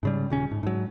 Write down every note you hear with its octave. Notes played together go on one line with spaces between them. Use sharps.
G#2 C#3 G3
D#1 C#3 C#4
G#2
G#2 F#3